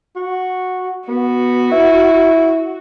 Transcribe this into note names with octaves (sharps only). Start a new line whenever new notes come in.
F#4
B3 F#4
E4